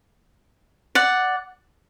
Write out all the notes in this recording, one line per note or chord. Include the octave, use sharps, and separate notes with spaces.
D5 F#5